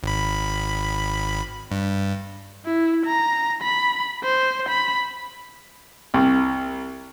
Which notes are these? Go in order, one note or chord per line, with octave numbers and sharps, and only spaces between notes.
G#1 B5
G2
E4
A#5
B5
C5
B5
C2